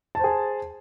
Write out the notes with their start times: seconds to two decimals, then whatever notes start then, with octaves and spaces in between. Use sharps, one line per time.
0.15 A5
0.19 C5
0.24 G#4